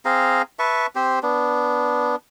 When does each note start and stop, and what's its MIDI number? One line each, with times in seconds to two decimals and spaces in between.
0.05 0.42 60
0.05 0.42 68
0.05 0.42 77
0.05 0.42 82
0.59 0.87 71
0.59 0.87 76
0.59 0.87 81
0.59 0.87 85
0.95 1.19 60
0.95 1.19 67
0.95 1.19 72
1.23 2.16 59
1.23 2.16 62